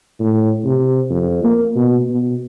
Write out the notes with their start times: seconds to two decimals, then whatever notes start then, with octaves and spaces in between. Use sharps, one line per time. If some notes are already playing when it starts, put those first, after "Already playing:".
0.20 A2
0.65 C3
1.10 F2
1.44 A#3
1.76 B2
2.10 B2